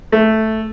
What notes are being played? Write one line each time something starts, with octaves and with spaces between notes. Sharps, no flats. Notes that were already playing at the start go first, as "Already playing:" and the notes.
A3